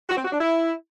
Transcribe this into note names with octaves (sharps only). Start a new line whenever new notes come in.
F#4
C4
F#4
D4
E4